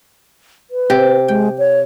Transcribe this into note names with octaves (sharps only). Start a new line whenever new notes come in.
B4
C3 G4
G#3 G5
C#5